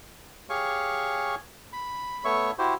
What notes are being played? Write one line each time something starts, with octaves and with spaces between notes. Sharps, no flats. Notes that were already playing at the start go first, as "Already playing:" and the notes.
G4 G#4 C#5 F5 G#5 C#6
B5
A3 B3 C#5 E5 C#6
E4 F#4 G4 C5